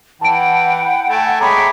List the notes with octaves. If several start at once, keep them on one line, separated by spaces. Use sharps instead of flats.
E3 F#5 G5 A5 B5 D7
A3 G#5 A5
G#3 C#5 E5 G5 A#5 B5 D6